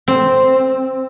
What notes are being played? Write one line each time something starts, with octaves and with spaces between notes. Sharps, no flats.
C4